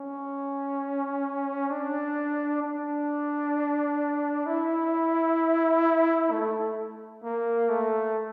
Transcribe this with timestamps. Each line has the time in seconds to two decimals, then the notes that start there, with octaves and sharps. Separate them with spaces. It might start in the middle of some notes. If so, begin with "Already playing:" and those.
Already playing: C#4
1.70 D4
2.62 D4
4.46 E4
6.31 A3
7.24 A#3
7.70 A3